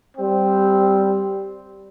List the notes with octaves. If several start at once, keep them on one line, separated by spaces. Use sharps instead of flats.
G3 C4